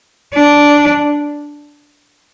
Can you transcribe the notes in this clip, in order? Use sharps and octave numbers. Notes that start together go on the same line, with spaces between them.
D4